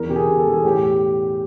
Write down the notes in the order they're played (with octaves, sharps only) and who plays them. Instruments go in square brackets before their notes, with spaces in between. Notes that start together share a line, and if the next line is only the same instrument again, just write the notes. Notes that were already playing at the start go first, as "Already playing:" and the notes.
Already playing: [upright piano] E2 A#4
B2 G4
G#4
B2
A4
E2
G#4
A2 G4